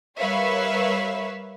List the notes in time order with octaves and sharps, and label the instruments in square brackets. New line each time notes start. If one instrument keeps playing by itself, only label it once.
[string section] G3 A#4 B4 C#5 E5 F5